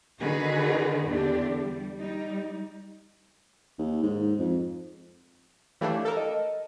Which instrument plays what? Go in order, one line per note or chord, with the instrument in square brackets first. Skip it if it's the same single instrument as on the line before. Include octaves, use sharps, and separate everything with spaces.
[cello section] D3 D#3 D#4 F#4 G#4 B4
E2 D3 D4 G4
G3
G3 D#4
[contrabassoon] D#2
G#2
F2
[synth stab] E3 A3 D4 [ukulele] G4 C#5 F5
[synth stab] A4 A#4
[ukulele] D#5